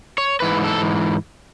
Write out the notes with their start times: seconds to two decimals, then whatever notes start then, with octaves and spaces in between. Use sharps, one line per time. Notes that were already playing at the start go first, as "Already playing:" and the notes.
0.18 C#5
0.40 G#2 E3 B4
0.64 A4